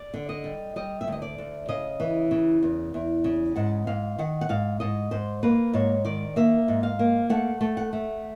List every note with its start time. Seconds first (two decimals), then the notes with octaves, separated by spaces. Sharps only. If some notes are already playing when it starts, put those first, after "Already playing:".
Already playing: D5
0.14 D3
0.29 D#5
0.44 G3
0.76 G3 D#5
1.01 E5
1.07 D2 D#5
1.22 D5
1.38 D2
1.68 C#3 D#5
2.00 E3
2.31 C#3
2.63 E2
2.94 E2
3.24 C#3
3.56 G#2 F#5
3.87 G#2 F5
4.18 D#3 F#5
4.41 F#5
4.49 G#2 F5
4.80 G#2 D#5
5.11 G#2 C5
5.43 A#3 B4
5.73 G#2 C#5
6.05 D#3 D5
6.36 A#3 E5
6.68 G#2
6.83 F5
6.99 A#3
7.30 A3 F#5
7.61 A3
7.77 F#5
7.93 A3